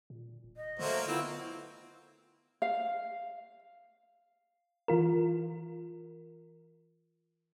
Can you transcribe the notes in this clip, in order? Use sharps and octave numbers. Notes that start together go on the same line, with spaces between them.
A#2
D#1
D#5
D3 F#3 A3 A#3 C5
B3 C4 E4 F4 F5
F5
E3 F4 A#4